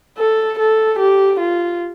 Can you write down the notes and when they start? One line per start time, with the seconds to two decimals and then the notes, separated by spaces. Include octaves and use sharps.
0.18 A4
0.59 A4
0.99 G4
1.40 F4